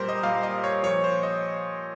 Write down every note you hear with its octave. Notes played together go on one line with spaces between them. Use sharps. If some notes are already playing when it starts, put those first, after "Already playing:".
Already playing: A#2 G3 G4 A#4 C5
D#5
A#2 G3 F5
D#5
C#5
A#2 F3 C#5
C5
D#5